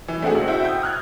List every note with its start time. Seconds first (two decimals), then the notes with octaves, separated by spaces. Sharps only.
0.08 E3
0.22 A3 C4 D4 F#4 G#4
0.35 C#2
0.48 E4 F#4 C5 E5 G5
0.65 D#6 G6
0.82 D#6 F6 F#6 G#6